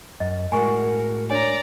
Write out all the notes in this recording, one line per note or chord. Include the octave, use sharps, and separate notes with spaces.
F#2 D#5
A2 G#3 F#4 A#4 G#5 C#6
D4 C#5 D5 G#5 A#5